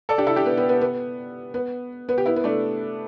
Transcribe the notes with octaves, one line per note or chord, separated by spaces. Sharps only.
A4 D5
D4 G4
E4 A4
D4 G4
B3
B3
B3
B3
B3
B3
G4
B3 E4
B3
A3 D4